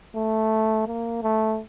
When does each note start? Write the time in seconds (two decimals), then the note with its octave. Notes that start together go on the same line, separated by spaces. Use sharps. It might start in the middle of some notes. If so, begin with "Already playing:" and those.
0.15 A3
0.87 A#3
1.23 A3